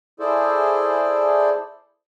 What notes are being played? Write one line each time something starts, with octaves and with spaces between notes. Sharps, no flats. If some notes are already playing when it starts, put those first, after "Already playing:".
E4 G#4 A4 C5 D5